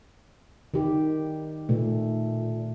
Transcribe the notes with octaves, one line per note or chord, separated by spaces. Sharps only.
D#3 G4
A#2 A3